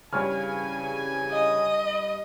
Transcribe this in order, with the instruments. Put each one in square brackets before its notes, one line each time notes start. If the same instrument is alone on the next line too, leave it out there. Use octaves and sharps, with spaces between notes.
[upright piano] G2 C#5 F6 [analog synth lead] C#3 [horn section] E3 C4 G#5
[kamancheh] D#5